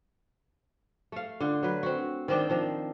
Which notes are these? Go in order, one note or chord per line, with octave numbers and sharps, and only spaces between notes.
A3 F5
D3 F4
F#3 B4
C4 F#4
D#3 C4 D4 G5
D#3 F3 D4